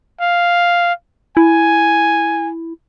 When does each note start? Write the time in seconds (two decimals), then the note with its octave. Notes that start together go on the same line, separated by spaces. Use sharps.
0.21 F5
1.37 E4 G#5